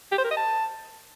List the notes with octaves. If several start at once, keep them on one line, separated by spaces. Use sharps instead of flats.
G4
C5
A#4
D#5
A5